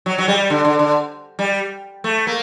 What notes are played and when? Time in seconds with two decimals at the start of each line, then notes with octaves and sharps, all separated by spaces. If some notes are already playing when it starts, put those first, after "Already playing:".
0.06 F#3
0.18 F#3
0.28 G3
0.50 D3
0.65 D3
0.79 D3
1.39 G3
2.04 A3
2.27 A#3